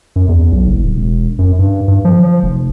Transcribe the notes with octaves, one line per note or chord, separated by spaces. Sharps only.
F#2
E2
B1
F#1
D1
E1
F#2
G2
G2
F3
F3
F1